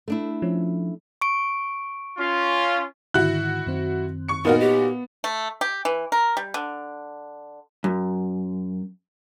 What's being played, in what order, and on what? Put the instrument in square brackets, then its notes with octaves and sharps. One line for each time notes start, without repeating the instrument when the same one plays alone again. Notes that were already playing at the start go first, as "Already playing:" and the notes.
[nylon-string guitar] A3 D4 E4 [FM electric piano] A4
[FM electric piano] F3 C#4
[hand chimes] C#6 D7
[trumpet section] C#4 F4
[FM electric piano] G#2 D3 D#3 [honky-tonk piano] E4 F#4 [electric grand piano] F#6
[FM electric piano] F#2 D#3 C4
[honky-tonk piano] C#6 C#7
[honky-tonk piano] A#2 D#4 F#4 [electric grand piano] B3 [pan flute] A#4
[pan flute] G4 [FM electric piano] C#5 D#5
[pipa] A3
G4
E3
A#4
G3
D3
[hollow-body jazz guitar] F#2